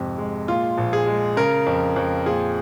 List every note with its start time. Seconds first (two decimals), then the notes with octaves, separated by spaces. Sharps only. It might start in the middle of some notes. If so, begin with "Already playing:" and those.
Already playing: G#1 F2 C3
0.18 G#3
0.48 A#2 F4
0.78 A#1
0.93 G#4
1.07 G#3
1.37 C#3 A#4
1.67 F2
1.96 F2
2.26 A#2 G#4